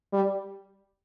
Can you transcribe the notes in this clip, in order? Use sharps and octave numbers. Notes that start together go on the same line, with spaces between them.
G3